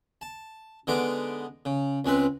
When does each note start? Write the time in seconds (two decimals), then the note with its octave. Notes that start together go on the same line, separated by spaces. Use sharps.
0.21 A5
0.87 D3 G#3 B3 D#4 D6
1.65 C#3
2.05 C#2 G#3 C4 B4